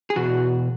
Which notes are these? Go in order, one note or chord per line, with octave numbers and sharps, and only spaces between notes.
G#4
E2 B2 F#4